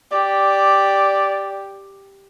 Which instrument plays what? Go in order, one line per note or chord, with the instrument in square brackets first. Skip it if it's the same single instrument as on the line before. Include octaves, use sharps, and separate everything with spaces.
[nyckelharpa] G4 [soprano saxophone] D5